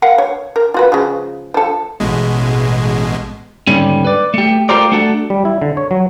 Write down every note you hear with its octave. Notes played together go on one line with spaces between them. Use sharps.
A#4 F5 F#5
C#5
A#4
F4 F#4 B4
C#3 F3 G#3
F3 A4
A1 B2 G#3
D#2 G#2 D3 G3 C#4
B4 D5
A3 G4
A3 F4 G4 A#4 C5 D5
A3 D4 F#4 A4
G3
E4
D3
C#5
F#3